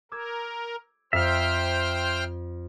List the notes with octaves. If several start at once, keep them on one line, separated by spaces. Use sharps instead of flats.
A#4 D6 E6 G#6
F2 C5 E5 F5 G5 F6